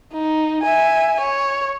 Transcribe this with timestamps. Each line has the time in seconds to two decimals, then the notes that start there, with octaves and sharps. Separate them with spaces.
0.12 D#4
0.62 E5 G#5
1.20 C#5